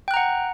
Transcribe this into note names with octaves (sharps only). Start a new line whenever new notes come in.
F#5 G5 A#5 F#6